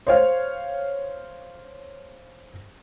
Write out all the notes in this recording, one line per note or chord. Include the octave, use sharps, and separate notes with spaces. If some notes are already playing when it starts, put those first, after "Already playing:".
C5 C#5 F5